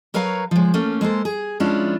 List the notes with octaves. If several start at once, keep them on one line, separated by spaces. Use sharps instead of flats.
F#3 A#4 B4 C#5 F5 A#5
F3 G#3
A3 A#3 C#4
G#3 A#3 A4 C5
G#4
F3 G#3 C#4 D4 E4 F4